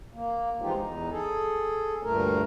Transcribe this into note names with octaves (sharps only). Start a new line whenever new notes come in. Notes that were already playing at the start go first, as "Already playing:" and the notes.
A#3
E3 F3 G#3 D#4 F4 G4
E2 D#4
G#4 A4
D2 G2 A#2 A3 A#4